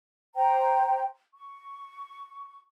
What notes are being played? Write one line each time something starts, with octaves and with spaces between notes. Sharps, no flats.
C5 G5 A#5
C#6